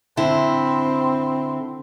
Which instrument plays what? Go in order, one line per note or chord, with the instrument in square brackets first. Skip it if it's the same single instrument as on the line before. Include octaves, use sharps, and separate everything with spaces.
[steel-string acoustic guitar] D3 E4 [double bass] C4